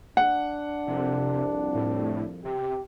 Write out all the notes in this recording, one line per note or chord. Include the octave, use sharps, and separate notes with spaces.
D4 F#5
C2 F2 C3
A2
C3 G4